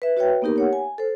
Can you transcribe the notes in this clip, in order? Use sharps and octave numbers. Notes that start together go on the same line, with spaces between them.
B4 E5
F#4 B4 C#5 E5 G5
A#3 B3 D#4 G4 A#4
G4 C#5 F#5
G#5
A4 C5